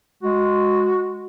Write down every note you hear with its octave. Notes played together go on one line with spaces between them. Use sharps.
G#3 F#4